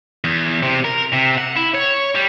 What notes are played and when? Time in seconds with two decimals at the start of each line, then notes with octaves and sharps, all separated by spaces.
0.24 E2
0.63 C3
0.84 A#4
1.13 C3
1.38 F#5
1.57 E4
1.75 C#5
2.15 G3